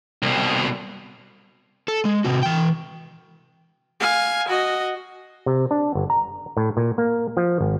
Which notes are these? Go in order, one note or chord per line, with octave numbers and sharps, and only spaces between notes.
C2 B2
A4
G#3
C3 F#4
E3 G5
F5 G#5
F#4 D#5
C3
D4
G1
A#5
A2
A#2
A#3
F3
G#1